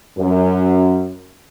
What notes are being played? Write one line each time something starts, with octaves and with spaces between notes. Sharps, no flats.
F#2